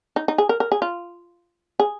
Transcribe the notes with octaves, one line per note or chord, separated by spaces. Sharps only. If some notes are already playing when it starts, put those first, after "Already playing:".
D#4
D#4
G#4
A#4
A#4
G#4
F4
G#4